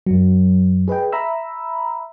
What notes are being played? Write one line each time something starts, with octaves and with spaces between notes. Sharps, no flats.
F#2 F#3
G#4 B4 D#5 G5
E5 A#5 B5 E6